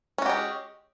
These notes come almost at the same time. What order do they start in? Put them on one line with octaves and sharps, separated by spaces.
C#4 F#4 G4 G#3